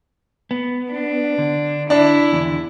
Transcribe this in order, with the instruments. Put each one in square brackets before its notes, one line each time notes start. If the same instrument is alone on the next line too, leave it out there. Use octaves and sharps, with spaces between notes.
[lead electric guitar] B3
[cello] D4
[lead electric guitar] D3
[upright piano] D4 [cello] E4
[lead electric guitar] E2 D3